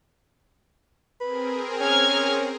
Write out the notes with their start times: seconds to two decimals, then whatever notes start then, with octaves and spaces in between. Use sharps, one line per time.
1.20 C4 G#4 A#4 B4
1.80 C#4 F6 G#6